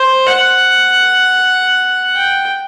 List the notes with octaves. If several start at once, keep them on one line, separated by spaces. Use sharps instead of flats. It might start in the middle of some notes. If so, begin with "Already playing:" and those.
Already playing: C5
F#5
G5